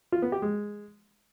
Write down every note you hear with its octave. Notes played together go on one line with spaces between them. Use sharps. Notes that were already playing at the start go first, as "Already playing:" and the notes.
F4
B3
G4
G#3